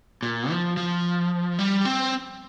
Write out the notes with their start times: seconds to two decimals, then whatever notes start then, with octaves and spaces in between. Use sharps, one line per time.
0.23 A#2
0.50 F3
0.77 F3
1.59 G3
1.85 C4